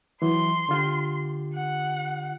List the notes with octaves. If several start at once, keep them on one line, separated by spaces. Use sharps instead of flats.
E3 F#3 C6
D3 F4 G4
F#5